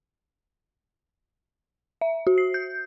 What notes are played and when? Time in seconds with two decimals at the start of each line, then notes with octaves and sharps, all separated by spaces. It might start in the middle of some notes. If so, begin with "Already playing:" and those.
2.01 E5
2.27 F#4
2.38 C7
2.54 G6